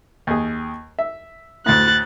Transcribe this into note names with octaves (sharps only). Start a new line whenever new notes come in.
D#2 G#4
E5
D2 A2 F#6 A6